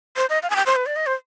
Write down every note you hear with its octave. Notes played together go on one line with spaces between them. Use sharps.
C5
D#5
F5
G#5
G5
C5
B4
D5
D#5
C5